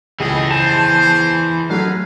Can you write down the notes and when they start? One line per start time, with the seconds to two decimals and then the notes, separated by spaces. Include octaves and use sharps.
0.20 C#2 E3 D#4 G#4 A4 D#5
0.51 C5 A5
1.70 F#3 G#3 A3 B4 F5